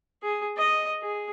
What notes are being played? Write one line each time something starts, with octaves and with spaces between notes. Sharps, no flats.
G#4
D#5
G#4